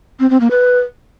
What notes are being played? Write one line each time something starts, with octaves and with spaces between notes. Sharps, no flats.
C4
C4
A#3
B4